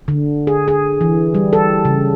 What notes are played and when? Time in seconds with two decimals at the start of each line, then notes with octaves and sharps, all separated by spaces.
0.08 D3
0.47 G#4
0.68 G#4
1.01 E3
1.34 G3
1.53 A4
1.85 C#3